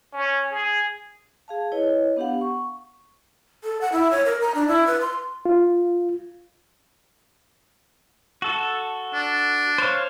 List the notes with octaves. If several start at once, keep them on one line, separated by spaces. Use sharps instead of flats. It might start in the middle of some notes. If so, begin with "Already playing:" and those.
C#4
G#4
G#4 F5 A5
E4 B4 C#5 D#5
B3 D4 G4 F5 F#5
C#6
A4
F#5
E4
C#5
A#4
A#5
D4
E4
B4
C6
F4
F#4 A4
D4
C5 C#5 F5